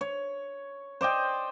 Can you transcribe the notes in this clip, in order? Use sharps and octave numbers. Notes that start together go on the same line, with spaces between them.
C#5
C5 D5 D#5 G5